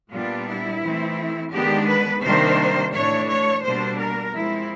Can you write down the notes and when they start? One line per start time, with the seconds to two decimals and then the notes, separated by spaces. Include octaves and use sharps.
0.12 A#2 G3 B3 D4 F4
0.47 E4
0.82 E3 A3 C4
1.52 D#3 G#3 B3 D4 G4
1.88 B4
2.23 C3 D#3 G3 A#3 D4 C5
2.93 A2 E3 A3 D4 C#5
3.28 C#5
3.63 B2 G3 A#3 D4 C5
3.98 A#4
4.33 F3 G#3 C4 E4